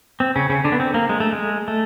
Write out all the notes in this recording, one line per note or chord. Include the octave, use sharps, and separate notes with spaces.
C4
C#3 C#4
C#3 C#4
D3 D4
B3
C4
A#3
G#3
A3
G#3
A3